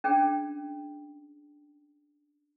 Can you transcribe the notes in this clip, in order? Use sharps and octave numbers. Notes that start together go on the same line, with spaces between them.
C#4 D4 G#4 G5